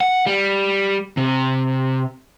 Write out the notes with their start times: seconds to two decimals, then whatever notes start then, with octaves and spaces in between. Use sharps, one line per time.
0.01 F#5
0.26 G3
1.17 C3